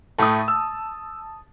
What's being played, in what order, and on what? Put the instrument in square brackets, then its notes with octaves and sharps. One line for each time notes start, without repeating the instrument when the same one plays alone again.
[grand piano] A2 A3 [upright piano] A5 D#6
[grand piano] E6